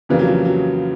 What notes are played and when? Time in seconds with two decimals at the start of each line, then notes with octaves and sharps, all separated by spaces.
0.09 F2 C#3 E3 F3 G3 A#3
0.19 F#3
0.28 F3
0.45 F#3